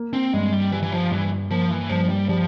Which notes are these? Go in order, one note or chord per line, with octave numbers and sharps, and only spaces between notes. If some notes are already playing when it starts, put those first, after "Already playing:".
Already playing: A#3
C4
G2 G#3
G3
E3 G3
E3
F3
G2 E3
F3 A#3
E3
G2 F3
G3
F3 G3